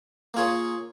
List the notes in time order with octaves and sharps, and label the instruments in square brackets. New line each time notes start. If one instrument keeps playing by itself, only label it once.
[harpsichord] A#3 F4 G#4 C#5